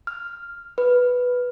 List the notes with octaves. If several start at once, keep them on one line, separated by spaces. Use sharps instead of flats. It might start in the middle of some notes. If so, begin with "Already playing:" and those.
F6
B4